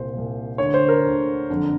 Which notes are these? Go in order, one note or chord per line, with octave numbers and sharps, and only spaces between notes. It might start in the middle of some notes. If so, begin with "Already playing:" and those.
Already playing: C2 A#2 C5
C2 A#2
D2 D3 C#5
C5
A#4
D2 D3
F#1 F2 D3